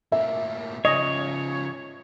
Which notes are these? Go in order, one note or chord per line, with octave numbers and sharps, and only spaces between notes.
A2 A#3 E5
C#3 F3 C#5 D#5